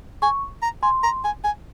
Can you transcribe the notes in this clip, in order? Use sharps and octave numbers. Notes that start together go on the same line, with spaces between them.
G#5 C#6
A#5
G#5 C6
A#5
G#5
G#5